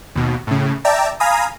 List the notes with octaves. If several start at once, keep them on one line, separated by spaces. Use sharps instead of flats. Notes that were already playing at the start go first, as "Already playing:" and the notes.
D#2 B2
A2 C#3
D5 E5 G5 A5 A#5
F5 G#5 A#5 B5 D#6